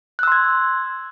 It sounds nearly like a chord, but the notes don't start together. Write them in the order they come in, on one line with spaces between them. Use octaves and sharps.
F#6 E6 C6 G#6